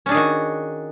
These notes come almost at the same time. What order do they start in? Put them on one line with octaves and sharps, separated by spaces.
C#4 D4 G#4 D#3 F#4